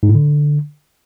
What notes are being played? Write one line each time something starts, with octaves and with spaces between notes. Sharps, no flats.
G#2
A2
D3